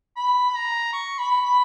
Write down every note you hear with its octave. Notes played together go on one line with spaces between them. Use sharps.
B5
B5
A#5
C#6
B5
B5